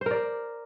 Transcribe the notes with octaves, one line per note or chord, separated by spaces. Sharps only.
A#4 C5 D5